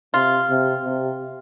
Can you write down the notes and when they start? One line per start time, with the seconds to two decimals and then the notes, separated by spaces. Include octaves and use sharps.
0.14 C3 F4
0.50 C3
0.85 C3